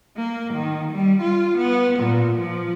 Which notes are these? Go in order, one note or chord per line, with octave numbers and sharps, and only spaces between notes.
A#3
D#3
G3
F4
B3
A#2
F3